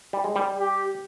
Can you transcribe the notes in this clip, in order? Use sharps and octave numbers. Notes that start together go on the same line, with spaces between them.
G3
G#3
G3
G4